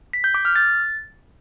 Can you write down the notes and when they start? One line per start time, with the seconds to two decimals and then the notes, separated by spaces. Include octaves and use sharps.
0.13 B6
0.24 G6
0.34 D6
0.45 F6
0.56 A6